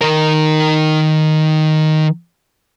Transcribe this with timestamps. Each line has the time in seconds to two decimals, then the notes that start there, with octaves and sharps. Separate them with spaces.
0.01 D#3 A#4